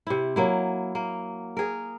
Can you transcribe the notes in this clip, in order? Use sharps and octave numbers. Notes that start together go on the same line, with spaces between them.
C3 E4
F#3 A#3 E4
A#3
G#4 A#4